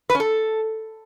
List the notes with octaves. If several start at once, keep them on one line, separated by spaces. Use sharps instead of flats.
B4
C#4
A4